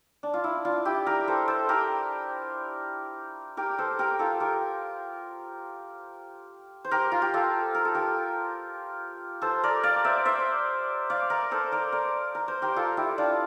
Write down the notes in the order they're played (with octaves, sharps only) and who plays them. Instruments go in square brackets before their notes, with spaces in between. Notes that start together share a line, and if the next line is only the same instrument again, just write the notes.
[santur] D4
F4
E4
D4 F4
E4 G4
G4 A#4
A4 C5
A4 C5
G4 A#4
G4 A#4
A4 C5
G4 A#4
F4 A4
G4 A#4
C5
G4 A#4
F4
G4
F4 A4
A#4
A4
G4 A#4
A4 C5
A#4 D5
D5 F5
C5 E5
C5 E5
D5 F5
A#4 D5
A4 C5
A#4 D5
A#4 D5
A#4
C5
G4 A#4
F4 A4
E4 G4
D4 F4